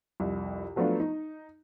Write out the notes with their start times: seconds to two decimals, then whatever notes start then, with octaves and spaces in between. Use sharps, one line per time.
0.20 C2 F2
0.76 F3 F#3 A3 B3 D4 F4
1.00 D#4